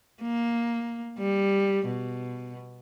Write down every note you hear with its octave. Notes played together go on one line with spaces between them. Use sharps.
A#3
G3
B2